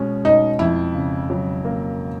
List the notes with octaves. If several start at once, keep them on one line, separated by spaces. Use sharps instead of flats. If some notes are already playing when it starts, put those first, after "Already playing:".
Already playing: B2 G#3 C#4
B2 D#4
F2 E4
C#3
F#3
A#3